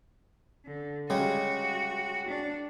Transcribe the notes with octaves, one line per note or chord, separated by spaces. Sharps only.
D3
C#3 G3 G#3 F#4
D4